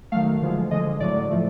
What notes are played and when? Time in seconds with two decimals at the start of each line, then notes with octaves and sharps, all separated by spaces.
0.12 D#3 F#3 A3 F5
0.42 D3 F3 G#3
0.71 D3 F3 G#3 D#5
1.00 A2 F#3 A3 D5
1.31 A2 F3 A3